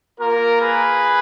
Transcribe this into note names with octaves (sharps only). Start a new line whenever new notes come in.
A#3 F4 A#4
G#4 B4